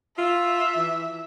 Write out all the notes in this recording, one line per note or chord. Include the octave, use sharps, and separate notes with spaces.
F4 E5
E3